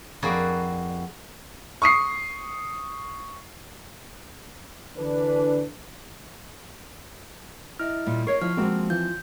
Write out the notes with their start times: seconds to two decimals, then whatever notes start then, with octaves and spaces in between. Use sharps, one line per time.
0.22 F2 A#3 F#4 G#4 B4 D5
1.82 C#6 D#6 C7
4.97 D3 E3 D4 B4
7.80 E4 D#5 E5 F6
8.06 A#2 G3
8.27 A#4 C#5 D#5 C#6 C7
8.42 F3 E4 D#5 F6
8.57 F3 G#3 A#3 C4 F#4
8.90 E3 F4 G6